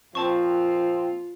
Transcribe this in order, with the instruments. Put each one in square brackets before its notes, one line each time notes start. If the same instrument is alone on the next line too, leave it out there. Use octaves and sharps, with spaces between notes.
[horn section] A#2 C4 [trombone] F3 [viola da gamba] F4 [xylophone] C5 A5 C#6